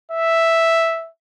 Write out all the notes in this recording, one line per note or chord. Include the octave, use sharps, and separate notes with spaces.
E5